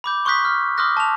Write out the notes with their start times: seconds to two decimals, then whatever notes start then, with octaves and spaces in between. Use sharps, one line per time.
0.04 B5 D6 G6
0.25 C6 C#6 D#6 F#6 G6 B6
0.45 F6
0.78 C6 D6 D#6 F6 F#6 A#6
0.97 A5 F7